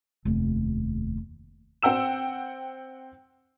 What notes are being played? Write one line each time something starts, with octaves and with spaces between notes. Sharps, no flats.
F1 D#2
C4 F#5 G5 E6 E7